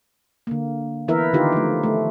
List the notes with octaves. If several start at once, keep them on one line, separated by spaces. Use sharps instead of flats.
D3 A#3
E3 B3 E4 A#4 B4 E5
D3 D#3 D#4 F4 G4
F3 A3
A3